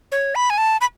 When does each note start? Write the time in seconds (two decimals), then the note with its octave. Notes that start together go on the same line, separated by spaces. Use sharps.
0.12 C#5
0.35 B5
0.50 G#5
0.58 A5
0.81 B5